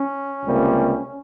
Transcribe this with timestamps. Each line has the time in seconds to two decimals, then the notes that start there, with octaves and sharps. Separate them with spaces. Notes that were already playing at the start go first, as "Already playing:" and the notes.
Already playing: C#4
0.44 C#2 C3 G3 A#3